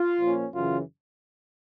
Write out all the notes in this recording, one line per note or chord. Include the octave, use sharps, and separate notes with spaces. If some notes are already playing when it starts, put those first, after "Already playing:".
Already playing: F4
A#2 F3 A#3 C#4
F#2 C#3 E3 F4